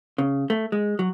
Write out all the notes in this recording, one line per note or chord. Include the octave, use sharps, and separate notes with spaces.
C#3
A3
G#3
F#3